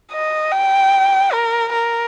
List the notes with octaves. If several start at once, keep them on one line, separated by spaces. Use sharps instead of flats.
D#5
G5
A#4
A#4